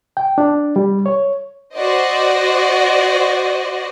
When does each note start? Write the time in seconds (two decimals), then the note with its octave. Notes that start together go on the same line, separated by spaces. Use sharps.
0.17 G5
0.38 D4
0.76 G3
1.06 C#5
1.74 F#4 C5 D5 D#5